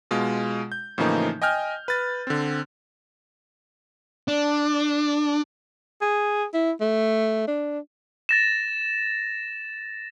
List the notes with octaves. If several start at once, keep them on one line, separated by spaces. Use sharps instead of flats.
B2 G#3 F4
G6
A2 C#3 E3 F3 A#3 D#4
D#5 G5 G#5 F6 G6
B4 A6
D3 C4
D4
G#4
E4
A3
D4
A6 A#6 E7